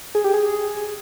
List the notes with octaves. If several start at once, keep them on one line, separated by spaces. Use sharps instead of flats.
G#4
G4
G#4